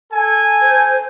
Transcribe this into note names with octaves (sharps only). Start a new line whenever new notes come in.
A4 G#5
C5